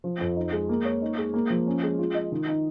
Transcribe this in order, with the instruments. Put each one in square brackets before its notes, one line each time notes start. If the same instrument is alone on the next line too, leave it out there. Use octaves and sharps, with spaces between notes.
[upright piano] F3
F2
D#4
G#3
A#3
C#5
D#4
G#3
A#3
F3
C#4
G#3
F4
D#5
D#3
D#4